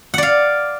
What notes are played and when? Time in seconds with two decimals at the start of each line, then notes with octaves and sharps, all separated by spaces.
0.14 F#5
0.18 D5
0.23 F5